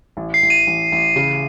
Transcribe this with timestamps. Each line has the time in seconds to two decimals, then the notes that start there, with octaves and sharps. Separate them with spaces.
0.17 A1
0.34 C7
0.42 A1
0.50 D#7
0.67 A1
0.92 A1
1.16 C#3